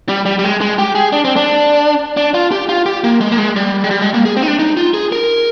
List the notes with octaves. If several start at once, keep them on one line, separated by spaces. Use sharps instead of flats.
G3
G3
G3
G#3
G#3
G4
G#4
D4
C4
D4
D4
F4
G4
F4
G4
A#3
G#3
A#3
G#3
G3
G#3
G3
G#3
A#3
G#4
C4
D#4
D4
D#4
F4
G#4
A#4